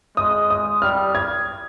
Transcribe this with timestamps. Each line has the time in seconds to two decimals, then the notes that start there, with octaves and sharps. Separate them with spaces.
0.17 G#3 D#6
0.50 D#6
0.82 G3 F6
1.15 G#6